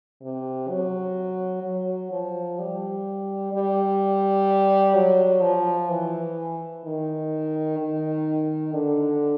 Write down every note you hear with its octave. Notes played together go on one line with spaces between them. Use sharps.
C3
F#3
F#3
F3
G3
G3
F#3
F3
E3
D#3
D#3
D3